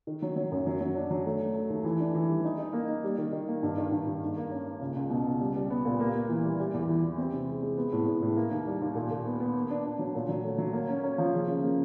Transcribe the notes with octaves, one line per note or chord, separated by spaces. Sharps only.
D#3
F#3
F#3
F#2
F#3
F#3
D4
F#3
A3
A3
A3
D#2
E3
D4
E3
G3
D#4
D#4
A#3
D#4
G3
D#3
D#3
A#3
G2
D#3
G2
G2
G#2
A#3
C#4
C#4
C#2
C#2
B2
C#2
G3
G3
B3
A#2
A#3
A#3
E3
G3
G3
E2
E3
E3
C4
C3
G#3
G#3
B3
A2
A2
A2
A#3
D#2
G3
D#2
A#2
A#2
B3
B3
A#3
D4
D4
F#3
A#2
F#3
A3
F#3
A#3
C#4
C#4
F3
C#3
C#3
A#3